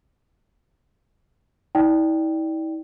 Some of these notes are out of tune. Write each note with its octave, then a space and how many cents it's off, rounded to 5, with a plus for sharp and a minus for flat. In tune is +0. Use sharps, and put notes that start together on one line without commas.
E4 -45 D5 +0 G5 +0